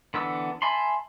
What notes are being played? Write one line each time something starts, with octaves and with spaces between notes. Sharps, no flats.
D3 E3 B3 D4 E6
E5 G#5 A5 B5 C6